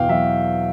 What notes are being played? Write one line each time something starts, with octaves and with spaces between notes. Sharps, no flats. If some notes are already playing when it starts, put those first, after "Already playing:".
Already playing: E2 B2 F5 G5
F#3 E5